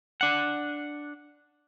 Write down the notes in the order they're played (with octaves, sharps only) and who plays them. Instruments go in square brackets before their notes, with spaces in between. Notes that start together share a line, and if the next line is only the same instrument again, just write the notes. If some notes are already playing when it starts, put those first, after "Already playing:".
[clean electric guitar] D4 F#5